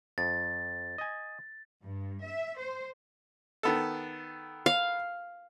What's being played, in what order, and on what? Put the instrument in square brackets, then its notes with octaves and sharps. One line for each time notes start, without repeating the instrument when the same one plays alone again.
[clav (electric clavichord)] F2 [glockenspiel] A6
[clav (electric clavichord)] D#5 G#5
[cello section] G2
E5
C5
[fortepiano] D#3 B3 A4
[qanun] F5